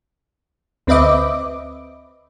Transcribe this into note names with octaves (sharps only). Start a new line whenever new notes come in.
D2 C4 B4 D#5 E5 D6